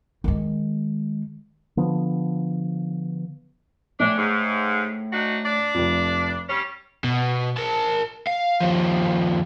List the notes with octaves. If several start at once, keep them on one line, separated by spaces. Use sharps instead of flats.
D#3 G#3
D3 F3 B3
A2 C#4 D4
G#2
D4 D#4 F#4
D4 D5
F1 F2
G3 C#4
B2
A#4 A5
F5
D#2 F3